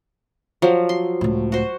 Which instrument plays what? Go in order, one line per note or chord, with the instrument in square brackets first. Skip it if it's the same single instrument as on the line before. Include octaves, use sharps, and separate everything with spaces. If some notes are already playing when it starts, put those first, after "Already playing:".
[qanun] F3 F#3
C6
[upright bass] C#2 A2
[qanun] F#4 C5